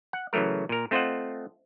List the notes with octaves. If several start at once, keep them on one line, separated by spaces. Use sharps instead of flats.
F#5
C#3 E3 F#3 A3 A#4
A#2 A#4
A3 C4 F4 C5 D#5 F#5